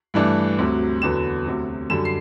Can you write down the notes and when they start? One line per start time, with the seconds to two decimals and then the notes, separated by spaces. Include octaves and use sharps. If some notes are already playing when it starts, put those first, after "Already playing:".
0.14 G2 E3 A3 D4
0.58 D2 C3 F#3
1.02 E2 D3 F#3 B3 E7
1.46 D2 C3 F#3
1.90 F#2 D3 G3 E7
2.05 C7